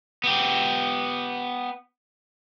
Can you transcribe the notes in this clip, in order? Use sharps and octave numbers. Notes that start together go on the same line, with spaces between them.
B3 G4